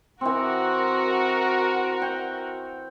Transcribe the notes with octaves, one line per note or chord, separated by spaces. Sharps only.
E3 C4 F#4 A#4
G5